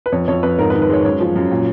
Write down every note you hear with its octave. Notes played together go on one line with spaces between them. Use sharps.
B4
F2 C#5
F2 C#5
F2 B4
G#2 A#4
B4
D#3
B4
G#3 C#5
F#2 C#5
F3
F#2
A#2